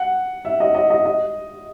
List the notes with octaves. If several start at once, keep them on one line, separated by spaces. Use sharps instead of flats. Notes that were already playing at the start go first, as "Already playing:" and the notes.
Already playing: F#5
E5
D#5
D#5
D#5
D#5